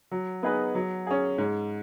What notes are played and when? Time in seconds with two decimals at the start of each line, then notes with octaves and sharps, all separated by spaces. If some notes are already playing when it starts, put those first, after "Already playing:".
0.11 F#3
0.43 B3 D#4 G#4 B4
0.75 F#3
1.07 C#4 G#4
1.38 G#2